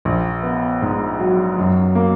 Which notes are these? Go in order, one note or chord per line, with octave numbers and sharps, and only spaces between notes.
A#1
B3
G#2
F#3
F#2
A#3